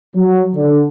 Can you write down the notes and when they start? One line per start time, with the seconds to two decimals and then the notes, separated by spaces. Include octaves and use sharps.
0.15 F#3
0.55 D3